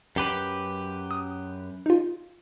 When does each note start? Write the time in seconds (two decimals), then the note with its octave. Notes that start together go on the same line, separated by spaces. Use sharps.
0.16 F#2 G4 B4
1.11 D#6
1.86 D#4 F4